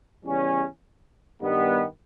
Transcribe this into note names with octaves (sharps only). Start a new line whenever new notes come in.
E2 C#3 G3 C#4
G2 D#3 G3 B3